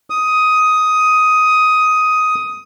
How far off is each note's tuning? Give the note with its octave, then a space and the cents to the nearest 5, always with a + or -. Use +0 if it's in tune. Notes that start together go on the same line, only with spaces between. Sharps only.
D#6 +10